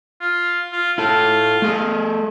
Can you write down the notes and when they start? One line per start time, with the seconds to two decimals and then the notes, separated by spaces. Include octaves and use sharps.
0.21 F4
0.73 F4
0.98 E4 F4 A4
1.62 A3 G#4 A4